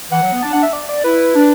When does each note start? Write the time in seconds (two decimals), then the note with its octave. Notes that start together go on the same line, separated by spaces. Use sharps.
0.11 E3 F#5
0.23 F#3
0.33 B3
0.42 D4 A5
0.53 D4 F#5
0.63 E5
0.73 D5
0.89 D5
1.04 E4 B4
1.35 D4